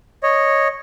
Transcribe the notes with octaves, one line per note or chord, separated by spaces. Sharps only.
C#5 D#5